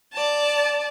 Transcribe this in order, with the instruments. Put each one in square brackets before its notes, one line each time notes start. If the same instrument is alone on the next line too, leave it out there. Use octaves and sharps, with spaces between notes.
[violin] D5 A5